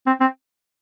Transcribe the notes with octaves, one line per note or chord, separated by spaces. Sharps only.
C4
C4